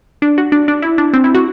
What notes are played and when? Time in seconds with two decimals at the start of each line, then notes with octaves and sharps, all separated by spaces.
0.22 D4
0.38 F#4
0.52 D4
0.68 D4
0.82 E4
0.98 D4
1.13 C4
1.24 E4
1.35 F#4